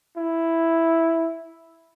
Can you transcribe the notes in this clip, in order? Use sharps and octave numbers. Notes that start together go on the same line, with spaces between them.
E4